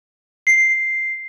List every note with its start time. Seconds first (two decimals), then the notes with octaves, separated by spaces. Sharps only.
0.47 C7